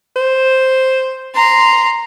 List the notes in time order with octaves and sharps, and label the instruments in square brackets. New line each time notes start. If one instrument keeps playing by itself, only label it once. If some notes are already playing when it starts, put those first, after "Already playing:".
[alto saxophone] C5
[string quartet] A#5 C6